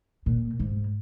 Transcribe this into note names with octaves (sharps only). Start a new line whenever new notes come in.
A#2
G#2